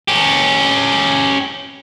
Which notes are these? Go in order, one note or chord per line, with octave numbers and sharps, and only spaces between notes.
C#4 G4